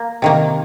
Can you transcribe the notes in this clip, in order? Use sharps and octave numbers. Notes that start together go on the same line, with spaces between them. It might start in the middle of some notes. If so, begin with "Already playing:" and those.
Already playing: A#3
C3 D#3 A#3